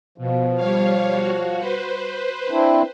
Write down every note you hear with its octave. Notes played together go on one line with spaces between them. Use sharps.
B2 F3
G3 C#5 F5
F#4
B4 C5
C4 D4 E4